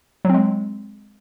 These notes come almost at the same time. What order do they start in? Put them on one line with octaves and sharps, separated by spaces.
F#3 C4 G#3